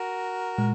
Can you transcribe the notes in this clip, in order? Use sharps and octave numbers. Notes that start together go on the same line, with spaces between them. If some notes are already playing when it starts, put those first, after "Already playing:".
Already playing: F#4 A#4
A#2 G#3